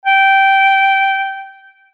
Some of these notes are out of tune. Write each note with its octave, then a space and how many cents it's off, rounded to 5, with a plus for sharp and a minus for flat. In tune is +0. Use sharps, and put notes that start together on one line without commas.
G5 -10